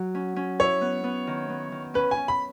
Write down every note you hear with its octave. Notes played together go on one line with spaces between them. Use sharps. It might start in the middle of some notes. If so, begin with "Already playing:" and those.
Already playing: F#3
C#4
C#4
E4 C#5
B3
B3
D#3
B3
D#3
C#4 B4
G#5
C#4
B5